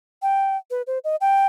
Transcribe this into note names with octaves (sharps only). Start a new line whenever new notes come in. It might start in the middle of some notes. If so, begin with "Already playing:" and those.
G5
B4
C5
D#5
G5